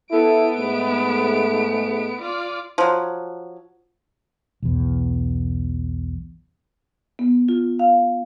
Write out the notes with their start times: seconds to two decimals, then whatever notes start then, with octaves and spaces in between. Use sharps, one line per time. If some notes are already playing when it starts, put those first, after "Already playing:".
0.11 B3 E4 A4 D7
0.57 G#2 A3
2.22 F4 D5
2.78 F3 F#3
4.62 B1 E2
7.19 B3
7.49 F4
7.79 F5